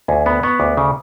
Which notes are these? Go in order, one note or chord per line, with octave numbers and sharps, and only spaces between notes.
D2 G#5
B3 B5
B3 C#6
D2 D6
C#3